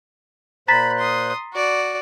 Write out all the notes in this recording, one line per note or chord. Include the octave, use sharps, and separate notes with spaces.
A#2 C5 A#5 B5 F#6 A6 B6
C6 D#6
F#4 D5 C#6